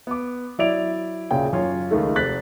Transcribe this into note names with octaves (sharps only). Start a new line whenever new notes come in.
B3 D6
F#3 E4 D5 D7 F7
F#1 A#2 C#3 G5
F#2 F4 C#5
C#2 D#3 A3 A4
F1 C5 F#6 A6 B6